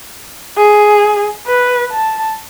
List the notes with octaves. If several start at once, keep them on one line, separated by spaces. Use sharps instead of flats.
G#4
B4
A5